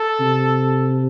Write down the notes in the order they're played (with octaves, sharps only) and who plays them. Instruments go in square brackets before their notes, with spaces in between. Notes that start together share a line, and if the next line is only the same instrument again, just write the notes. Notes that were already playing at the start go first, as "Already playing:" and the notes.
Already playing: [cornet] A4
[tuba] C3